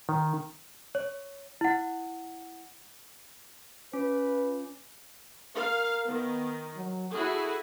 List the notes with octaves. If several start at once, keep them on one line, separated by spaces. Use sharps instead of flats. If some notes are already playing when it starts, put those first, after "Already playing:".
D#3
C#5
E4 F#5
C#4 F4 B4
A#4 F5
D#3 B3
F#3
E4 F#4 G#4 A4